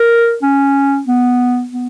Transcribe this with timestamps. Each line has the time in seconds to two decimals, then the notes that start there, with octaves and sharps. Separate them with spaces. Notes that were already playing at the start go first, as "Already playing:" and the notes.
Already playing: A#4
0.42 C#4
1.07 B3
1.72 B3